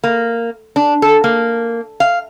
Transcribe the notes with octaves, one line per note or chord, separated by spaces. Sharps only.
A#3
D4
A4
A#3
F5